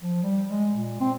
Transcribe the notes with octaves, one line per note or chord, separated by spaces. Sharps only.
F3
G3
G#3
A#2
C4